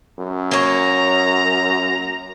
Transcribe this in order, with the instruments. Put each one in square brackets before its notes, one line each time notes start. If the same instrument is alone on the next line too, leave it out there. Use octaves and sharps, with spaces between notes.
[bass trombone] F#2
[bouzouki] A#3 C#5 [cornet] A#5